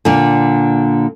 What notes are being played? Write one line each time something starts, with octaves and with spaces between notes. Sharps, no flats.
A#2 D3